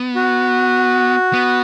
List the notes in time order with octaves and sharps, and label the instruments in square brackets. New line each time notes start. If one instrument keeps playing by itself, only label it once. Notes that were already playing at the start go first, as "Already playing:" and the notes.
Already playing: [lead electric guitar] B3
[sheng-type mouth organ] F#4
[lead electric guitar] B3